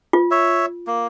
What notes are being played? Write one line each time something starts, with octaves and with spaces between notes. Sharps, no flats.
F4
C#5 E5
A#3